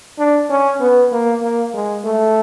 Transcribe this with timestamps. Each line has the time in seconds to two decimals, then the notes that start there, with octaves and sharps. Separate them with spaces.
0.19 D4
0.50 C#4
0.80 B3
1.12 A#3
1.42 A#3
1.74 G#3
2.04 A3